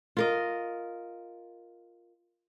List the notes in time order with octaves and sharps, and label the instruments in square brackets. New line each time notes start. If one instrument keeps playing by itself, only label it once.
[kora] F4 A#4 D#5